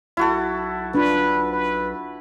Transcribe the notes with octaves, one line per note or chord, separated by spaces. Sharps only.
B1 E4 F#4 A4
D4 F4 B4
B4